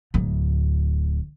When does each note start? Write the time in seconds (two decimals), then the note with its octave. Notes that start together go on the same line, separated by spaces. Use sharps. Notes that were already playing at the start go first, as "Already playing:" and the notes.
0.14 D1 D2